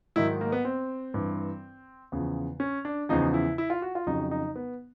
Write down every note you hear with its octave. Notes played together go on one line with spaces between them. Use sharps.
G#2 D#3 F#3 E4
A#3
B3
C4
G2 E3
E2 C#3 F3
C#4
D4
E2 C#3 F3 D#4
E4
E4
F4
F#4
F4
F2 C#3 F#3 D#4
D#4
B3